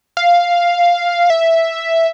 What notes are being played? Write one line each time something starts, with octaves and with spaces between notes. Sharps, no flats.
F5
E5